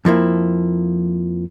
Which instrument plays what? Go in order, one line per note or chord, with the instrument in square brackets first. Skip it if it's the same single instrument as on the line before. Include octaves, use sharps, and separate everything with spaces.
[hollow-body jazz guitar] F2 F3 A#3 E4